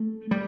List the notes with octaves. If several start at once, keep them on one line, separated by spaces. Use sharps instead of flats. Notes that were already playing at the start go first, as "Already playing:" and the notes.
Already playing: A3
G3